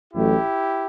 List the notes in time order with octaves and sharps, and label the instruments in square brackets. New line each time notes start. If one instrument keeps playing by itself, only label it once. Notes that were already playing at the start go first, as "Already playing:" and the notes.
[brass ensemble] A1 A2 F#3 A3 E4 G4